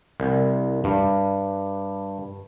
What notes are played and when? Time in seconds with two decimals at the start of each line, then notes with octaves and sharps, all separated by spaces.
0.20 C2
0.84 G2